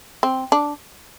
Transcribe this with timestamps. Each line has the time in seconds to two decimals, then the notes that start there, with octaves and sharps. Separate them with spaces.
0.23 C4
0.52 D4